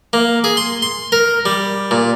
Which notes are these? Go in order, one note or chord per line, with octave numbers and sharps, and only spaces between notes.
A#3
G#4
C6
C6
A#4
G3
A#2